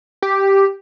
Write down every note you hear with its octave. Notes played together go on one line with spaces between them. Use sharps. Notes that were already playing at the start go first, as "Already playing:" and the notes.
G4